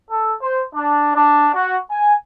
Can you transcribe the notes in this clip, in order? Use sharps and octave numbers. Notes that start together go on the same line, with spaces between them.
A4
C5
D4
D4
F#4
G#5